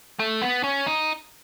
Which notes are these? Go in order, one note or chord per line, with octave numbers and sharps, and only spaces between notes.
A3
B3
C#4
D#4